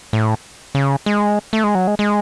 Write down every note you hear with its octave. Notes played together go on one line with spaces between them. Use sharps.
A2
C#3
G#3
A3
G#3
F#3
G#3
G#3